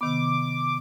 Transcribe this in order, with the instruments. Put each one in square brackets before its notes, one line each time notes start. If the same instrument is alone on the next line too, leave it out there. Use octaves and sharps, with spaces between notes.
[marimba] C3 D#3 B3 [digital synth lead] D6